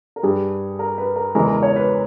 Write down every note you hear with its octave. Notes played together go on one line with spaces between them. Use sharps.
A#4
G2 G3 G#4
A#4
B4
A#4
E2 C#3 E3 G#3 A#4
A#4
C#5
B4